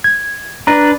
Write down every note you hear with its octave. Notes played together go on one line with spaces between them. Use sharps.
G#6
D4 B4 A#5